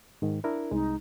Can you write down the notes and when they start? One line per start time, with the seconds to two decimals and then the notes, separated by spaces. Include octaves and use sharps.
0.22 G#2 D#3
0.44 D4 E4 A#4
0.71 C2 G#3 D#4